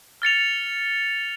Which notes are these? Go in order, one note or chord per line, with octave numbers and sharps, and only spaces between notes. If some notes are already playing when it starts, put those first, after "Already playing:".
F6 A6 C#7 F7